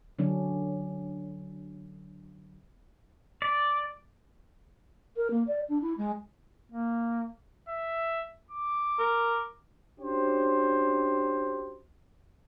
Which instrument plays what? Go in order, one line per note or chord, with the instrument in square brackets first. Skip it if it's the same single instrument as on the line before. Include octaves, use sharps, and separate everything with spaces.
[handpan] D3 F#3 C#4 D4
[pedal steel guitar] D5
[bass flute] A#4
A#3
D5
D4
E4
G#3
[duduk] A#3
[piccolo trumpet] E5
D6
[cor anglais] A#4
[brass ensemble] C#4 D4 F#4 G4 C5